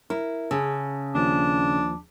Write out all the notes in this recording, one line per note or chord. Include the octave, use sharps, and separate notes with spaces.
E4 A#4
C#3 A5 E6
D#2 F3 D4